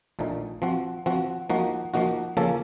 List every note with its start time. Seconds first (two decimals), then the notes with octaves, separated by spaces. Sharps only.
0.19 A#1 A#2 F3 A3 D#4
0.62 F3 C4 F#4
1.06 F3 C4 F#4
1.50 F3 A#3 D#4 F#4
1.94 F3 A#3 D#4 F#4
2.37 C#3 F3 A#3 C#4 A4